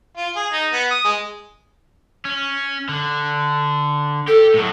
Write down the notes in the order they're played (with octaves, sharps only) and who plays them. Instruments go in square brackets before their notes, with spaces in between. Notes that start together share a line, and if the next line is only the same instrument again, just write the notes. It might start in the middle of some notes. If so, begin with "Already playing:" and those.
[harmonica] F4
G#4
D#4
B3
D#6
G#3
[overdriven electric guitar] C#4
D3
[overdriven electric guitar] G4 [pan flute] A4
[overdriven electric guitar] A2 F#3